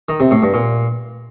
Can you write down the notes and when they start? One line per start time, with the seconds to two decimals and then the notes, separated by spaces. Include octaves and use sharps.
0.09 D#3
0.20 C3
0.31 A2
0.43 G2
0.54 A#2